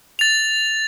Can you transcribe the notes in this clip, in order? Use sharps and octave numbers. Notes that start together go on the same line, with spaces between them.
A6 F7